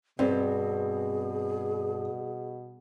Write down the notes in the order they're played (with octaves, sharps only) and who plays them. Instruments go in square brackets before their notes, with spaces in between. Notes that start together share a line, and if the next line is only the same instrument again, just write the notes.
[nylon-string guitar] G2 [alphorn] B2 [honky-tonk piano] C4 [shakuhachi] G#4